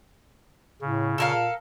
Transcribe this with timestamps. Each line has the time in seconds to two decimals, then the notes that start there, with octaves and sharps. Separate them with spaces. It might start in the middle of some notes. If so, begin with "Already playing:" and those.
0.81 A2 C#3
1.18 A#2 A4 A#4 F5